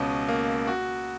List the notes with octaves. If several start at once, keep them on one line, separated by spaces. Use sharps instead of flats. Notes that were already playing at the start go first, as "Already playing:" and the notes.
Already playing: C#2 B2 C#4
A#3
F#4